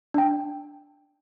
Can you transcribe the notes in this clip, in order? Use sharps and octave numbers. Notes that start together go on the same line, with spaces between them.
D4 G5